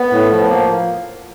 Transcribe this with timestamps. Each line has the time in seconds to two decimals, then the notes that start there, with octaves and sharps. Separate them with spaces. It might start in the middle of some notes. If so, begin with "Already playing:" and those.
Already playing: B3
0.11 A2
0.31 F3
0.49 A#3